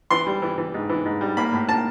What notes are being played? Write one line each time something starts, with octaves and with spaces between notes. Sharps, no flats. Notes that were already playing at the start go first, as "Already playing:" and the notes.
E3 C6
G3
E3
E3
G#2
E3
G#2
G3
A#3 B5
A2
A#3 A5